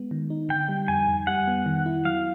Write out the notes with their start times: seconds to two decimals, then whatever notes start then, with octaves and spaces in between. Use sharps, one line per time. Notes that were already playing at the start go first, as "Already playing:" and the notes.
Already playing: G#3 B3
0.11 D#3
0.30 D#4
0.49 D3 G5
0.69 G3
0.88 F2 G#5
1.08 F2
1.27 G3 F#5
1.47 B3
1.66 D#3
1.86 E4
2.05 F#3 F5